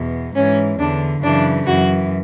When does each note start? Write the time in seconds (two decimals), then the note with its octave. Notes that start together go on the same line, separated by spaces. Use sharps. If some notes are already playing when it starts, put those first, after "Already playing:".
Already playing: E2 B2
0.35 G#2 E3 C#4
0.79 E2 D3 D4
1.22 F#2 C#3 E3 D4
1.66 F#2 E3 F#4